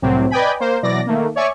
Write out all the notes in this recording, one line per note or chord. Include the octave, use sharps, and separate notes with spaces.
C2 A2 C3 F#3 C4
B4 D5 D#5 G5 G#5 B5
A#3 C5
B2 E3 F#3 D5 A#6
D#3 A3 A#3
C#5 D5 E5 G#5 C#6